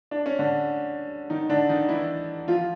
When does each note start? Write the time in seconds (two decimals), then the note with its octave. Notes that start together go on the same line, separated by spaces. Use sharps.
0.11 D4
0.26 C#4
0.39 D3 D4
1.30 D#3 D#4
1.49 D3 D4
1.69 D#3 D#4
1.89 E3 E4
2.48 F3 F4